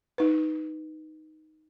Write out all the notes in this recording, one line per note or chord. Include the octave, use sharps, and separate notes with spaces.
D#4 B4